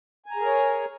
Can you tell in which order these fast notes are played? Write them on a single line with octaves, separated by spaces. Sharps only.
G#5 A#5 G#4 A#4 C#5